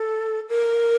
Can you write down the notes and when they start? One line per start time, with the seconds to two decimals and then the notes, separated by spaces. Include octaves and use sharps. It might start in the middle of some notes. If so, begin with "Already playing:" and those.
Already playing: A4
0.49 A#4